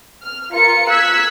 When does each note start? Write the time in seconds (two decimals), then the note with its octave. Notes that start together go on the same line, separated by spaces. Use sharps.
0.22 F6
0.52 F4 A#4 C#7
0.88 E6 F#6 G#6 B6